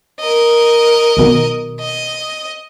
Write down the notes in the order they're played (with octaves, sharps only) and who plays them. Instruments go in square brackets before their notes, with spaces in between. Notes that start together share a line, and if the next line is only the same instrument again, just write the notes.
[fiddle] A#4 D#5
[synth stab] B1 B2 D#3
[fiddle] D#5